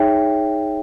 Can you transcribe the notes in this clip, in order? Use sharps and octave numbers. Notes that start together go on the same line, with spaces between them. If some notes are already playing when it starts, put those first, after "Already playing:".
Already playing: D#4 G#4 C#5 E5 G5